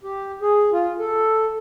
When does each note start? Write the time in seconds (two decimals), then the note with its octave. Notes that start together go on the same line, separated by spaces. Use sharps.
0.04 G4
0.42 G#4
0.72 F4
0.99 A4